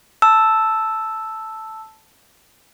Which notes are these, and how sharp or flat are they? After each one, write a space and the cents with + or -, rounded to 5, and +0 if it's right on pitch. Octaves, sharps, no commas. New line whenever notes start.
A5 +0 E6 +0